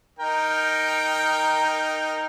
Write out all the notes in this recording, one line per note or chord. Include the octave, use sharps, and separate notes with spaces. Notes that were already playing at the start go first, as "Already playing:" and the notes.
D#4 A#4 G5